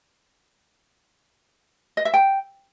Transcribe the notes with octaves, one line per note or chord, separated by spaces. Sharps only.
D#5
E5
G5